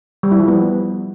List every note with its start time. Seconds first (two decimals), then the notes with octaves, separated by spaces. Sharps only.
0.23 G3
0.32 E4
0.40 F3
0.48 B3